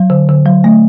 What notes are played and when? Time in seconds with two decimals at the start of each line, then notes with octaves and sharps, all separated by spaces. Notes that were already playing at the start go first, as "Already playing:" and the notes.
Already playing: F#3
0.10 D3
0.29 D3
0.46 F#3
0.64 A3